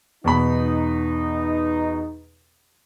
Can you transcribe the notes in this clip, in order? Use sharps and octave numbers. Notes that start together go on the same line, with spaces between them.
E2 B2 D#4 B5